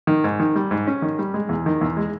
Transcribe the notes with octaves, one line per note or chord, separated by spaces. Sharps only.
D#3
G#2
D#3
G3
G#2
C#4
D#3
G3
G#3
E2
D#3
E2
G#3